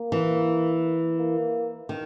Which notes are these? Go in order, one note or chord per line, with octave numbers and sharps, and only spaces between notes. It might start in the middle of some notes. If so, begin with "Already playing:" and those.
Already playing: A#3
E3
A#3
D#3